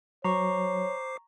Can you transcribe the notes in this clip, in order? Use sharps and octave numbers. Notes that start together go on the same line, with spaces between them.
F#3 C5 C#5 A#5 C#6 D6 C7